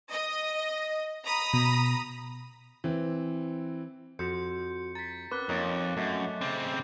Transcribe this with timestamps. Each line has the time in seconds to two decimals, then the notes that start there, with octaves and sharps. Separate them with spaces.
0.11 D#5
1.24 A#5 B5 D#6
1.53 B2
2.84 E3 C4
4.19 F2 F#4 C6 G6 C#7
4.95 A#5 A6 B6
5.31 C4 C#4 A#4 B4 D6 F#6 G7
5.49 F2 A#3 D#4 C#5 C#6
5.97 F#2 A3 D#5
6.41 C#3 C4 D6 A6